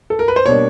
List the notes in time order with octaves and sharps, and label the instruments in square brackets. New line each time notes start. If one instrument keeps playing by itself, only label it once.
[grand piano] A4
A#4
B4
C5
B2 G3 A#3 D4 C#5